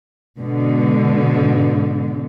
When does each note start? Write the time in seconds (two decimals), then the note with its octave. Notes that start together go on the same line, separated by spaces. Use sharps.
0.38 G#2 B2 D3